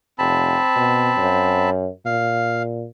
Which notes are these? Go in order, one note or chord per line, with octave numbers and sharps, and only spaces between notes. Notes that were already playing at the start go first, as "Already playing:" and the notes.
F1 C4 A5 B5
B2
F#2
A#2 F5